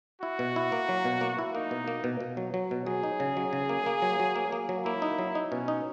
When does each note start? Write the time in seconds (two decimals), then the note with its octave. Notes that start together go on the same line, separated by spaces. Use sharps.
0.22 E4 F#4
0.39 B2
0.56 E4
0.72 A#3
0.89 F#3
1.05 B2
1.21 A#3
1.39 E4
1.55 A#3 D#4
1.71 B2
1.88 A#3
2.04 B2
2.20 B2
2.37 F#3
2.54 F#3
2.71 B2
2.86 F#3 G#4
3.03 D#4
3.20 C#3
3.37 F#3
3.53 C#3
3.69 A#3
3.86 A#3
4.02 F#3
4.20 F#3
4.36 A#3
4.52 A#3
4.69 F#3
4.85 A#3 E4
5.02 D#4
5.19 F#3
5.35 D#4
5.51 B2 C#4
5.68 D#4